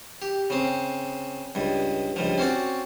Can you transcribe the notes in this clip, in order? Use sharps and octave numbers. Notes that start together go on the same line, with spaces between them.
G4
C#3 C4
C#2 G2
C#2 G2 F3
C4 C#4 F#4 D5